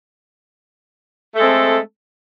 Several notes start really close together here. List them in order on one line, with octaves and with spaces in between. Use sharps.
A3 A4 G#3 C4